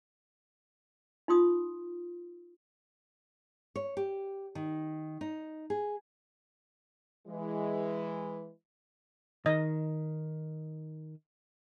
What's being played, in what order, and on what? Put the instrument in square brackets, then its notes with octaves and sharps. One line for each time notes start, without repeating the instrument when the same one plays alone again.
[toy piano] D#4 F4 C6 D#6
[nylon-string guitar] C#5
G4
D#3
D#4
G#4
[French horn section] E3 G#3
[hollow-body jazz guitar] D#3 [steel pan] D#5